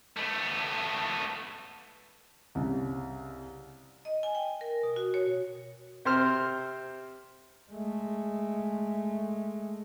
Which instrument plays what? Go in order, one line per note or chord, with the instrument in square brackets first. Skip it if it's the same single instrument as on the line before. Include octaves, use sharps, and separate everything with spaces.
[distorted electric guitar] A3 B3
[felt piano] C2 C#3
[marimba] D#5
G#5
G5
A#4
B2
F#4
C#5
[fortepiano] C3 C5 F6
[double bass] G#3 A3